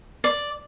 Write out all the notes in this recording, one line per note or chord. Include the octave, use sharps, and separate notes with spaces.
D5